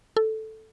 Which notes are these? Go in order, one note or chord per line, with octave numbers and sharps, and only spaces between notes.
A4